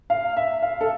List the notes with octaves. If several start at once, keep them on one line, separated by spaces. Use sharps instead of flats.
F5
E5
F5
A4